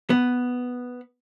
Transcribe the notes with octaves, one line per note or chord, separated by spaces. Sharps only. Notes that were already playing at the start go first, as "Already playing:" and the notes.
B3